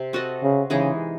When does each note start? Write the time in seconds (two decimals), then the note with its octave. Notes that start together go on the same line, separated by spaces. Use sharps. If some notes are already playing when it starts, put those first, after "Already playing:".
Already playing: C3
0.13 C4 F#4 A4 D#5
0.43 C#3
0.70 C#3 E3 G#3 D#4 G#4